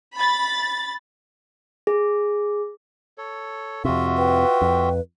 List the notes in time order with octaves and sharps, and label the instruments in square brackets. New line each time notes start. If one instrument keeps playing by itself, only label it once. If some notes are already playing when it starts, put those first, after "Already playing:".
[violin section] B5 A6
[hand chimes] G#4
[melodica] A4 C#5
[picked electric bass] F2 C3 [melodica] F4 F#4 E5 [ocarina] F#5
[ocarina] B4 [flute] G5
[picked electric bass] F2